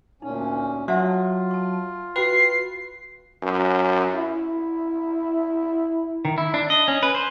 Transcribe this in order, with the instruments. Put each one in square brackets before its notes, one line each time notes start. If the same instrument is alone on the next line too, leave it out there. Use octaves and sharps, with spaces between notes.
[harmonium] D2 A#2 C#4 [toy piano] D#4
[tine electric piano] F#3 [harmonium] F4 [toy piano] E5 F#5 A5
[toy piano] A5 C#6
[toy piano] F#4 G5 [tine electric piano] B4 [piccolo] C7
[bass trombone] F#2
E4
[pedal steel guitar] D#3
E4
D4
D#5
C#4
B4
C5